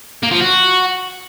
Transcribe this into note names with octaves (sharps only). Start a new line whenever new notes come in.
A#3
F3
F#4